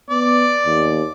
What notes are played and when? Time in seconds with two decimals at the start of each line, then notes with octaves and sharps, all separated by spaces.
0.10 B3 D5
0.66 D#2